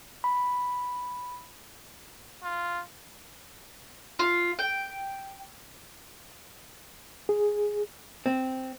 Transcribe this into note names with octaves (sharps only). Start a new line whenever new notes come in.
B5
F4
F4
G5
G#4
C4